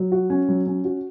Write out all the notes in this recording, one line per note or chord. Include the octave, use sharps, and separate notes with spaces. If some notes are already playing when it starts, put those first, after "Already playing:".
Already playing: F#3
F#4
C#4
F#3
C#4
F#4